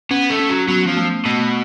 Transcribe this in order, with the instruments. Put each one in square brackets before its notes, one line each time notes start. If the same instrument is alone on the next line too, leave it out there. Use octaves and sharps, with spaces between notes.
[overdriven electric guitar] B3 [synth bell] C#4
[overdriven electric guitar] A3
[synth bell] C#4
[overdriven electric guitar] F#3
[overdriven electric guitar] F#3 [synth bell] B3
[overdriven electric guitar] F3
[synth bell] A3
[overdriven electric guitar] B2 [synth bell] A3